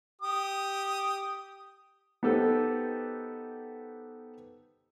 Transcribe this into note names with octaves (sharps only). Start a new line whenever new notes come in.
G4 D#6
B3 D#4 G4 A4 B4 C5